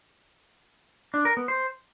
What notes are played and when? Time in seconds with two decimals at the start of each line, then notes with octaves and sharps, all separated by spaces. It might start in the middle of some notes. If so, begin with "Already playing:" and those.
1.14 D4
1.25 A#4
1.37 B3
1.48 C5